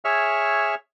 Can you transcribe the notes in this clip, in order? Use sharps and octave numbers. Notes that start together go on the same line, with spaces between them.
G#4 C#5 E5 C#6 E6 F6